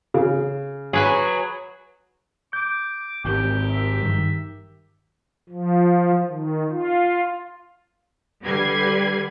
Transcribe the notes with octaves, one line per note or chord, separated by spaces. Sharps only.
C#3
F#3 G#4 B4 G#5
D6 G6
G#1 G4 A#4 G5
E5
G2 D#3
F3
D#3
F4
D3 G3 G4 B4 G#6 C7